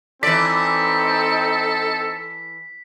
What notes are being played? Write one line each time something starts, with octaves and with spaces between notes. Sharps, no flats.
E3 C4 D#4 A4 D5 B6